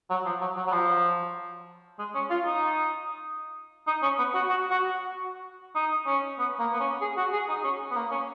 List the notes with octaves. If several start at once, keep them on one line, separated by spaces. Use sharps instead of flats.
F#3
F3
F#3
F#3
F#3
F3
G#3
C#4
F4
D#4
D#4
C#4
B3
F#4
F#4
F#4
D#4
C#4
B3
A#3
B3
C#4
G#4
F#4
G#4
D#4
C#4
B3
A#3
C#4